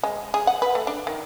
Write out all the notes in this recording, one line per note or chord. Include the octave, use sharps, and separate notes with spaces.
G#3
G#4
F#5
B4
A3
D4
D#3